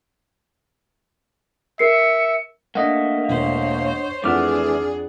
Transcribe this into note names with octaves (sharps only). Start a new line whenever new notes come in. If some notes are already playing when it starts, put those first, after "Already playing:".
A#4 E5 C7 C#7
A3 A#3 D4 D#5 F#5
E1 C5 C#5
F2 E3 A3 D4 G#4 F#5 D6 F6